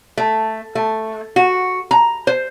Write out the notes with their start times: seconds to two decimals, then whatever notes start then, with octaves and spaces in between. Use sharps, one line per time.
0.17 A3
0.75 A3
1.36 F#4
1.91 A#5
2.27 C5